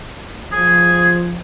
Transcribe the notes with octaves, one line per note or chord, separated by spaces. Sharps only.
F3 G#4